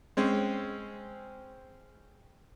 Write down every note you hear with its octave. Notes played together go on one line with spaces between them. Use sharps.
G#3 C4 C#4